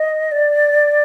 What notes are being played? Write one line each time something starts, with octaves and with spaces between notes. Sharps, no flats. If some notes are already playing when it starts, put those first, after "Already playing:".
Already playing: D#5
D5